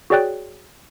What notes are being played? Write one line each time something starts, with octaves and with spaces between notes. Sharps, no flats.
F#4 G#4 C#5 D5 G5 F#6